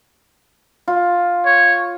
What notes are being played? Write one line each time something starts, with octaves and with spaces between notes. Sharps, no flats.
F4
C#5